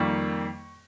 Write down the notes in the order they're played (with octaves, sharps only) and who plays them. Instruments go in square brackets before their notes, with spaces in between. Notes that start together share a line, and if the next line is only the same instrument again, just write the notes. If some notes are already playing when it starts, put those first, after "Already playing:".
Already playing: [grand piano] F2 D#3 G3 A#3 C#6